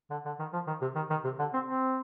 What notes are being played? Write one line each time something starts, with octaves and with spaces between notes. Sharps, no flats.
D3
D3
D#3
F3
D#3
C3
D#3
D#3
C3
D3
C4
C4